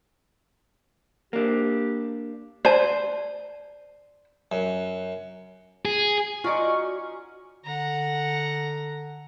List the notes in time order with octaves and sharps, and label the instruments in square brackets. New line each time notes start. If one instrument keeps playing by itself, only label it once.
[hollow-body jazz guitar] A#3 D4 [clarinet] G4
[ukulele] C5 [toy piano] D5 A5
[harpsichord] F#2
[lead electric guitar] G#4
[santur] C#4 D#4 G#5 [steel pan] F4 [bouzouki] F#4 D5 D#5 [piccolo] C#6
[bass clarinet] D3 [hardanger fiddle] F#5 A#5